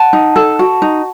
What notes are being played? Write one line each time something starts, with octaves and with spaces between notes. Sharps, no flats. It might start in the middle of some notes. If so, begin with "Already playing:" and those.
Already playing: F#5 A5
D#4
A4
F#4
D#4